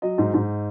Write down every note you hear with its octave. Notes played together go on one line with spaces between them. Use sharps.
F#3 D#5
G#2
G#2